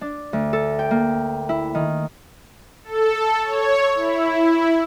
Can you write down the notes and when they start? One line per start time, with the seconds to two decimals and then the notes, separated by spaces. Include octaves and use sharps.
0.01 D4
0.33 D2
0.53 A4
0.79 G5
0.91 A#3
1.49 E4
1.75 D#3
2.84 A4
3.44 C#5
3.95 E4